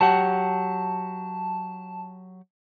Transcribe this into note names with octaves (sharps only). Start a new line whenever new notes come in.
F#3 G4 F#5 A5